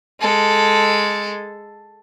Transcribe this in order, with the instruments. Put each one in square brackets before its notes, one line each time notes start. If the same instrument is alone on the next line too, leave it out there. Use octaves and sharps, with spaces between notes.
[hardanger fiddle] G#3 A4